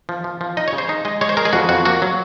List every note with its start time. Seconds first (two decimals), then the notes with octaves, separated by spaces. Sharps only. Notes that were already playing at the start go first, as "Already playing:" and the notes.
0.09 F3
0.24 F3
0.41 F3
0.57 D#4 D#5
0.68 C#5
0.73 C#3
0.78 C5
0.89 D#4
1.05 G#3 D#5
1.21 G#3 C#5
1.29 C5
1.37 G#3 A#4
1.45 G#4
1.53 F2 F#4
1.69 F2 F#4
1.85 A#3 F#4
2.02 F#3